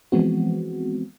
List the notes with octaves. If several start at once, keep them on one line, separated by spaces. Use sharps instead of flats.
E3 F3 G#3 B3 C4 F#4